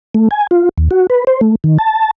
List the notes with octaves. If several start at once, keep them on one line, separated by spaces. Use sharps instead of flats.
A3
G#5
F4
D#2
F#4
B4
C5
A3
D#3
A5